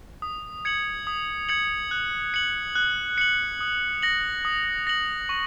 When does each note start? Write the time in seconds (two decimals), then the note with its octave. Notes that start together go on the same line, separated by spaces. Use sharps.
0.22 D#6
0.65 G#6 C#7 F#7
1.07 D#6
1.49 G#6 C#7 F#7
1.91 F#6
2.34 C#7 F#7
2.75 F#6
3.18 C#7 F#7
3.61 D#6
4.02 A#6 F#7
4.45 D#6
4.87 A#6 F#7
5.29 C#6